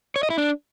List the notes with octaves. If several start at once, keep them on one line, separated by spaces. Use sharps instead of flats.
C#5
D#5
E4
D4